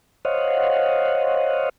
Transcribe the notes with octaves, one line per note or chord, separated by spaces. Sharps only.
C5 C#5 D#5 F5 F#5